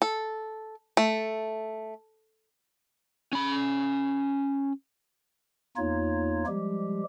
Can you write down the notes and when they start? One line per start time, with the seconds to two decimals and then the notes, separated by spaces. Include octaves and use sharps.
0.02 A4
0.97 A3
3.33 C#4 B5
5.77 E2 A#3 D#4 F4 C#5
6.47 F3 G3 G#3 G4